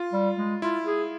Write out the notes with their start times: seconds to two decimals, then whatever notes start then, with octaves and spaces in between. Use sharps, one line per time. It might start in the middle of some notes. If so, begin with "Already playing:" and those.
Already playing: F4
0.13 G3
0.38 G#3
0.61 E4 F4
0.86 G#4